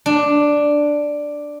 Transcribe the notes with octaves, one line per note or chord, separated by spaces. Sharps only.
D4